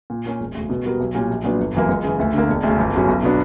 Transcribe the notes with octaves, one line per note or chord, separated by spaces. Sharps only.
A#2
A#3 C#4
E1
D2 C#3
B2
G3 B3 F#4 A#4
B1
A#2 G3 C#4
A#1
A#2 F#3 B3 D4
G1
F#2 E3 A#3
C#2
C#3 E3
D2
D3 A#3
E1
D2 C#3
G1
F#2 C#3 F#3 C#4
B1
B2 F#3 B3 D4